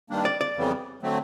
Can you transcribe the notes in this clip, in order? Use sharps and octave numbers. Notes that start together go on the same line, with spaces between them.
G2 D#3 G3 A#3 D4
D5
D5
F2 C#3 E3 G3 B3
D3 F#3 A3 C4